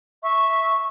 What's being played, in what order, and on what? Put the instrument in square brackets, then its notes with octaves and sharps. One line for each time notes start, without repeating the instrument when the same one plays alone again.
[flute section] E5 C#6